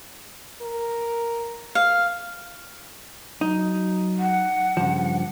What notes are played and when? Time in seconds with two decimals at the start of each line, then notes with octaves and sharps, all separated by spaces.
0.62 A#4
1.75 F5
3.41 F#3 D#4
4.19 F#5
4.77 G2 C#3 F3